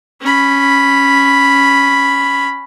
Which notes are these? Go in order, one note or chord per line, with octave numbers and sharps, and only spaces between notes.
C#4 B5